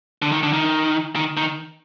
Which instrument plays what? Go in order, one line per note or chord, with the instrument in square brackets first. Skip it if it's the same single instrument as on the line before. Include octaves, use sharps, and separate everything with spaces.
[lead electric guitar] D3
D#3
D3
D#3
D#3
D#3